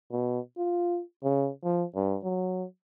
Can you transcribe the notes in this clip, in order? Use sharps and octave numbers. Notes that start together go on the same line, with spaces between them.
B2
F4
C#3
F3
G2
F#3